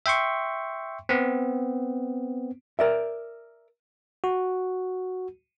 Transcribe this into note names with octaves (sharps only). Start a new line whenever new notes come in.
E5 G5 C6 C#6
B3 C4
A#4 D5 E5
F#4